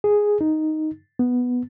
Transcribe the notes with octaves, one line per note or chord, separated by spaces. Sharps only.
G#4
D#4
B3